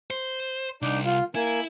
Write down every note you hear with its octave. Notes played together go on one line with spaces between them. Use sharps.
C5
C2 D4 D#4 D6
F4
A#3 E4 G#5